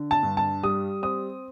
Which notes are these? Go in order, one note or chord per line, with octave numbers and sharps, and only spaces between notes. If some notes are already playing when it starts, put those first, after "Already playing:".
Already playing: D3
A5
G2
A5
G3 D#6
C4 D#6